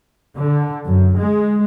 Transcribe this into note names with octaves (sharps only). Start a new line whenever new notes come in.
D3
F#2
G#3